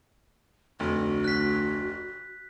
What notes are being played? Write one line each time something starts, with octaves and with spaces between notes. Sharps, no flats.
F1 D2 F#4
F#6 B6